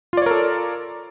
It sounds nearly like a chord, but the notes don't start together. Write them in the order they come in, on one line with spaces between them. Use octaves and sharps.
F4 D5 C#5 A#4 A4